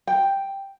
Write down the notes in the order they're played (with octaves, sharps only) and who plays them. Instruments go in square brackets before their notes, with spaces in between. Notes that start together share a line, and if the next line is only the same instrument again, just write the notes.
[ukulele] G5